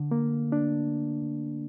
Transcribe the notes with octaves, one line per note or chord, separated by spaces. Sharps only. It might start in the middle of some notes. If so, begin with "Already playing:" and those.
Already playing: D3
A#3
D4